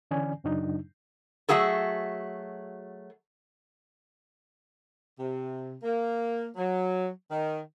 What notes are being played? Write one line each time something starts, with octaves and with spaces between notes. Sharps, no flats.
D3 E3 C#4 D5 G#5
F#2 C#3 F#3 D4 D#4
F#3 A3 F#4 G#4 A4
C3
A#3
F#3
D#3